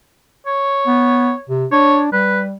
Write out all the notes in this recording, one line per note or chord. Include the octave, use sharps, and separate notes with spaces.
C#5
B3
C3
D4 C#5
G3 B4